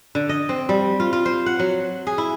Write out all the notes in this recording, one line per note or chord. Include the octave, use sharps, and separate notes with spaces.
D3
D#5
C4
G3
F4
F4
C5
F#5
F#3
G#4
E4